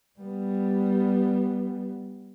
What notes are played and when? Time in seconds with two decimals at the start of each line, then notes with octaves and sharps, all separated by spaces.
0.20 G3 B3